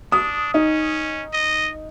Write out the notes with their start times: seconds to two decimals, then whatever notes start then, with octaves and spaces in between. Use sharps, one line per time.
0.12 D4 D#6
0.54 C#4 D#4
1.33 D#5